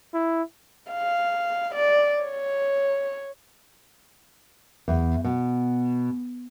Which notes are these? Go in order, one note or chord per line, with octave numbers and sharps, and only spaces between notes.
E4
F5
D5
C#5
E2
B2